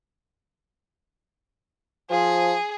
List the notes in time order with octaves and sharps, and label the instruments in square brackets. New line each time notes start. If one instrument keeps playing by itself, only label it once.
[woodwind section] F3 [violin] G#4